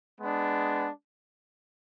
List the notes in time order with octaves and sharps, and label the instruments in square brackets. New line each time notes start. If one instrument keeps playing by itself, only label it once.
[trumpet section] G#3 B3 D4